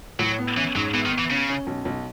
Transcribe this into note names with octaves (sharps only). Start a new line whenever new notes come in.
A2 F#3
B3
E3 C#4
G#2 F#3
E3 B3
D#3
B3
E3
C#3 C#4
C#4
B1
B1